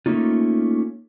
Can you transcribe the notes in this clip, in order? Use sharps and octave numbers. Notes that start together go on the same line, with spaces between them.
A3 A#3 C#4 D#4 F4